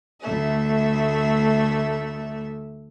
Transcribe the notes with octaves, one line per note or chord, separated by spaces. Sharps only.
D2 A3 E5